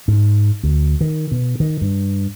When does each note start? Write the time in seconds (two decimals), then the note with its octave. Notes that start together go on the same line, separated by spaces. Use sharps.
0.08 G#2
0.63 D2
1.01 D#3
1.32 B2
1.60 D#3
1.81 G2